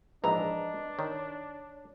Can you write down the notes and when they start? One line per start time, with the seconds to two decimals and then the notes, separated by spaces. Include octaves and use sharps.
0.24 A#1 G#2 E3 D4 B4 D#5 A#5
0.99 D#3 C#5